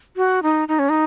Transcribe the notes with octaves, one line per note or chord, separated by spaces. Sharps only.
F#4
D#4
D#4
C#4
D#4